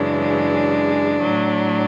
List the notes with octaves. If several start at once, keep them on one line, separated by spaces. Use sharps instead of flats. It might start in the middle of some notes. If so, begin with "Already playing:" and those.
Already playing: F#2 C#3 E3 G#3 D4
A2 F#3